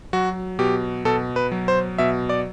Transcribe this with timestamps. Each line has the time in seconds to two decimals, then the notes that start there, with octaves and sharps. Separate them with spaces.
0.13 F#3 F#4
0.59 B2 G4
1.05 B2 A4
1.36 B4
1.52 F#3
1.68 C5
1.98 B2 E5
2.29 D5